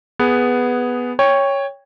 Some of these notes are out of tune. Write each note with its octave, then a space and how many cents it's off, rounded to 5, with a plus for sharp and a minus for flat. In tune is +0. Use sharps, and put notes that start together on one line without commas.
B3 +0 G#4 +0 B4 +0
C#5 +0 G5 +20